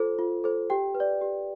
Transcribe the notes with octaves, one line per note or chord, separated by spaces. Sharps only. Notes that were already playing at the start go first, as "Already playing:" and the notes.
Already playing: F4 A4 C5
F4
A4 C5
G4 G5
B4
D5
G4